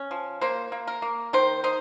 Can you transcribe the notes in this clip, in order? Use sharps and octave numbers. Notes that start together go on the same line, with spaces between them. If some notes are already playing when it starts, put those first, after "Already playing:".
Already playing: C#4
F3
A#3 C5
A#3
A#4
A#3
D#3 C5
D#4 C5